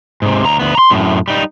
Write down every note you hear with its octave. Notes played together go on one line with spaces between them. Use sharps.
G#2 C3
D2 A#5
D2 B3
A#5 C6
F#2 A2
G3 D#4